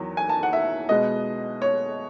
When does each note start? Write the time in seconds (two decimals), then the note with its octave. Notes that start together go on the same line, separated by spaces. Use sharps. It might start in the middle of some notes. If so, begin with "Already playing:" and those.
Already playing: E2 D#3 F#3
0.17 G#5
0.29 A5
0.43 F#5
0.53 E5
0.89 B2 G#3 B3 D#5
1.62 C#5